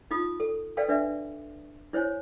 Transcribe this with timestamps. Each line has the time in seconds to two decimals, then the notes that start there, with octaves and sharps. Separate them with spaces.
0.11 D#4 F4 D#6
0.40 A4
0.77 A4 B4 D5 F5 G5
0.89 D4 B4 D5 E5
1.93 E4 C5 C#5 G#5